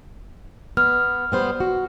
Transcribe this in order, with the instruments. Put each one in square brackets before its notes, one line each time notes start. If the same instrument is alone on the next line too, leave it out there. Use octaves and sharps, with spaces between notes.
[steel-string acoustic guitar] B3 [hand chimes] F6
[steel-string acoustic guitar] G3 B3 C5
F#4